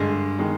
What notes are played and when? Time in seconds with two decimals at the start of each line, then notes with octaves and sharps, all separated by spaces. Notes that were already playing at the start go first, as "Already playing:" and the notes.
Already playing: G2 D3 G#3
0.39 D#3 G#3